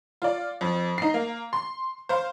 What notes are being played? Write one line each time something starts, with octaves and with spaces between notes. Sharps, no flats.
F4 D5
F2
D#4 C7
A#3
C6
C5 F5